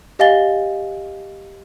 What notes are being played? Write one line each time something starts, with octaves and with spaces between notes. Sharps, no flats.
G4 D#5 F5 G#5 A6 G7